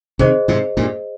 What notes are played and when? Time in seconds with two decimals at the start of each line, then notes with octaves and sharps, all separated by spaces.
0.19 C3 D#3 G#4 C5 D#5
0.48 G#2 C3
0.77 G2 A#2